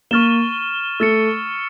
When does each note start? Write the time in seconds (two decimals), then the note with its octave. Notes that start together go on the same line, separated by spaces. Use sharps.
0.11 A#3 C#6 F6 A6 E7 G7
1.00 A3 E6 A6 C#7